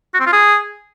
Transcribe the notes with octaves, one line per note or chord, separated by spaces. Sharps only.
F#4
C4
F4
G#4